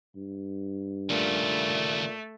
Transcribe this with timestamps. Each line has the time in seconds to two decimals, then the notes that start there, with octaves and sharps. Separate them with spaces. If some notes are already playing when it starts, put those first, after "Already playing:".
0.16 G2
1.10 D#2 A#2 C#3 A3